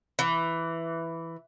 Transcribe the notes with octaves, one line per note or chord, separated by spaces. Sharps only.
E3